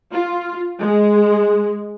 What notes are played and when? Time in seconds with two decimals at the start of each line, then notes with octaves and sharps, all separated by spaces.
0.12 F4
0.80 G#3